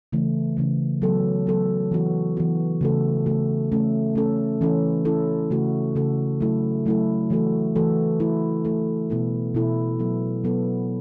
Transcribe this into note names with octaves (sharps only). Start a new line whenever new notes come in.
C#3 E3 A3
C#3 E3 A3
F#3 B3 A4
F#3 B3 A4
E3 B3 F#4
E3 B3 F#4
C#3 A3 F#4 A4
C#3 A3 F#4 A4
A3 C#4 A4
A3 C#4 A4
E3 C#4 E4 A4
E3 C#4 E4 A4
C#3 A3 F#4 A4
C#3 A3 F#4 A4
F#3 A3 E4 A4
F#3 A3 E4 A4
E3 A3 F#4 A4
E3 A3 F#4 A4
A3 E4 A4
A3 E4 A4
B2 B3 E4 A4
B2 B3 E4 A4
F#3 B3 A4
F#3 B3 A4